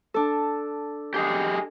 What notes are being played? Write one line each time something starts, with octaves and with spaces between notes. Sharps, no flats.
D4 A4
G4 G#4 D#5